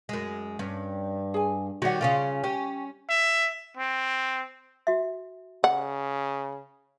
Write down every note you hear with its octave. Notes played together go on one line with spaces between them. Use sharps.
F#2 G#3
G2 C#4
G#4 G#5
D#3 G3 F#4 C#5 F#5
C#3 C#4 F4 D5
C#4 G4
E5
C4
F#4 E5
C#3 F#5